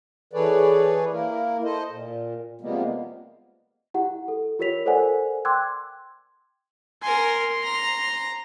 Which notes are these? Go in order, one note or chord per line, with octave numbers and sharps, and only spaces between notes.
E3 G#4 A4 B4 C#5 D5
A#3 E4 A#4
A4 C5 D#5
A#2
C3 F3 G3 G#3 A#3 B3
E4 G4 F#5
A4
F4 G4 A#4 C#5 B6 F7
A4 A#4 C5 D5 F#5 G#5
G5 C6 D6 E6 F#6 G#6
A#4 G#5 C6
A#5